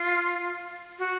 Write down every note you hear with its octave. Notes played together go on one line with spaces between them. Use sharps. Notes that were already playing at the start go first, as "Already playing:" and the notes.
Already playing: F4
F#4